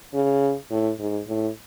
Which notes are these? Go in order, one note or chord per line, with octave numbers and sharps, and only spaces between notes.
C#3
A2
G#2
A2